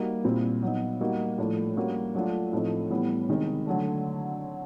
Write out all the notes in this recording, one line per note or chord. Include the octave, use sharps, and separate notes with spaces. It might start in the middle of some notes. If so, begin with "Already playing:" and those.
Already playing: G3 A#3 D#4 F#4
A#2 G3 C4 E4
F#3 B3 D#4
G3 A#3 D#4 F#4
A2 F3 A3 D4
G3 A#3 C#4 F#4
F#3 A3 D4 F4
A2 F3 A3 C4 D#4
A2 E3 G3 B3
C3 D#3 G#3
D3 F#3 A3